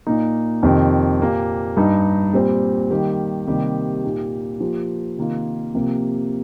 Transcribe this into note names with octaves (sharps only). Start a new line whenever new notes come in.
A#2 A#3 D#4
F2 C3 D#3
A#2 A#3 G4
G2 G3 D#4 G4
A#2 G3 C4
D#3 G3 A#3 G4
C3 D#3 G3 A#3 G4
A#2 A#3 D#4 G4
F3 A#3 G4
C3 D#3 A#3 F4
C3 F3 A#3 G4